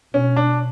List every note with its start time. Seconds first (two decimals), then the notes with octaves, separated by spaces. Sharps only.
0.14 B2 C#4
0.36 D4